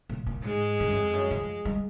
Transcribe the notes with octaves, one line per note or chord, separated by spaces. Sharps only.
A#2
A#2
G#2 G#3
G#2
F#2
F2
F#2
F3
G#3